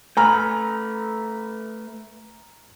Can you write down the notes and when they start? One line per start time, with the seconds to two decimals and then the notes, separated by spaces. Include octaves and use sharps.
0.17 A3 B4 G#5 A#5 F6